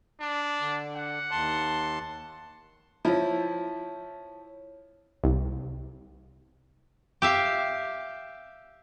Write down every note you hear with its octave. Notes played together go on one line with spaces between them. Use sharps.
D4
D3
F#5
D#2 A5 C6
F3 E4 C#5 A5
C2
G4 E5 F5